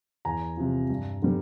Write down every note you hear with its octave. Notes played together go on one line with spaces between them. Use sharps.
E2 G#5 A#5
C3 F3
G2
D3 G3 B3